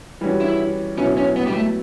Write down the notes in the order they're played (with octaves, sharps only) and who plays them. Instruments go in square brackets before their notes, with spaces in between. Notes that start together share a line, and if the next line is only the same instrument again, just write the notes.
[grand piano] E3 G3 C#4 F#4
[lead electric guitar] E4
[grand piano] B2 F#3 B3 E4 [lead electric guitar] C#4
[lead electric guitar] C#4
B3
G3
A3